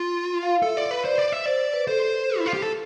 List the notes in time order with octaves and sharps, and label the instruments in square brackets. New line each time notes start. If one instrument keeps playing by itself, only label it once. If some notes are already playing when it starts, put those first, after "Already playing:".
Already playing: [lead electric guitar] F4
[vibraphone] F5
[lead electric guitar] A4 [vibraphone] E5
[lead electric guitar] D5
B4
[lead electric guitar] C5 [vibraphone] D5
[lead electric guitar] D5
E5
[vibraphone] C5 [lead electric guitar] D5
[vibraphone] B4
[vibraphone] A4 [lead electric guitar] C5
[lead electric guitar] E4
F4
G4
A4